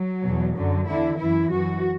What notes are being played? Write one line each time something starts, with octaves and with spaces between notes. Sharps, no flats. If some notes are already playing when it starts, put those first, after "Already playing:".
Already playing: F#3
E2 B2
F#2 D3 F#3
E2 D3 E4
F#2 E3 E4
F#2 E3 F#4